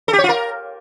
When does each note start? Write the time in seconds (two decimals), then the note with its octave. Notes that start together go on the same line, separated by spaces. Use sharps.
0.08 A4
0.13 G4
0.18 C#5
0.24 F4
0.29 A#4